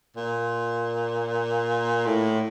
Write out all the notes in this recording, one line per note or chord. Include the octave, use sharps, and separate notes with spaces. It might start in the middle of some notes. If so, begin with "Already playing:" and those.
A#2
A2